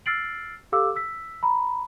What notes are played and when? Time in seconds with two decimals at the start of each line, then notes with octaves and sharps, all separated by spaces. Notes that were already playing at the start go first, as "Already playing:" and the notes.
0.06 E6 F6 A6 C7 D7 F#7
0.72 G4 A4 F5 D6 E6
0.96 E6 B6
1.43 A#5 B5